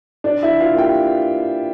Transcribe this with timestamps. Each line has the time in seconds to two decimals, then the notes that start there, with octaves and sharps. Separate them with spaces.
0.24 D4 D5
0.42 E4 E5
0.48 E3
0.60 F4 F5
0.72 A#3
0.77 G4 G5